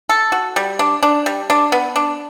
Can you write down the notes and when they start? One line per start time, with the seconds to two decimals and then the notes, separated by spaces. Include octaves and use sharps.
0.09 A4
0.32 F#4
0.56 G3
0.79 D4
1.03 D4
1.26 G3
1.50 D4
1.72 B3
1.96 D4